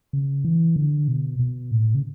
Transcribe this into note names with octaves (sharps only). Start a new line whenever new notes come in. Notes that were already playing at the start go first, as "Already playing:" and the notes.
C#3
E3
D3
B2
B2
A2
C#3